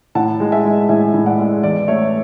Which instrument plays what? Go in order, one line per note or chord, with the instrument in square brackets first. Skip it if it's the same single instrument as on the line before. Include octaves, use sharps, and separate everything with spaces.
[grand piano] A2 F#5 A5
G#3
E5 G#5
G#3
A2 E5 G#5
A2
D5 F#5
G#3
E2 D5
A3 C#5 E5